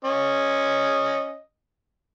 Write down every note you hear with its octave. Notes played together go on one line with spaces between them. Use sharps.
C#4 D#5